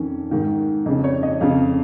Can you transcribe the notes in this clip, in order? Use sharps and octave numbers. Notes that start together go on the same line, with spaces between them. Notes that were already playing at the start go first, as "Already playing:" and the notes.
Already playing: F2 D#3 C#4
G#2 D#3
F2 C#3 D#4
C#5
D#5
F2 C#3 F5